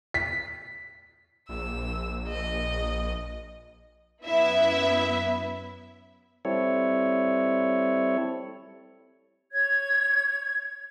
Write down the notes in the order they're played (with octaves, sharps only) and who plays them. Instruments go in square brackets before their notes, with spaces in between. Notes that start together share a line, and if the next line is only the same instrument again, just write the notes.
[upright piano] B6
[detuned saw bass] A#1 [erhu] E6
[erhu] D#5
[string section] F#2 B3 E4 E5
[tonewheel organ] G3 C4 E4 A4 C#5
[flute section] C#5 G#6